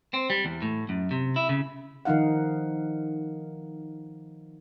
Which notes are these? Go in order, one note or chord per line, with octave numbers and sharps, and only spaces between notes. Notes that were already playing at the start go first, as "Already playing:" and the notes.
C4
G3
E2
A2
F#2
C3
E4
C#3
D#3 F3 D#4 F5 F#5